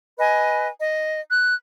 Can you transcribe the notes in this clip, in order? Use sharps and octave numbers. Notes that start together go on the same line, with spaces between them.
B4 D#5 G#5
D#5
F#6